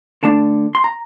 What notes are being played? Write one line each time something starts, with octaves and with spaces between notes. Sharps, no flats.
D3 A3 D4 A5
C6
A#5